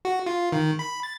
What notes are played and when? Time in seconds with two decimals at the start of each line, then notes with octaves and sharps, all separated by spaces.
0.05 F#4
0.26 F4
0.52 D#3
0.79 B5
1.03 A6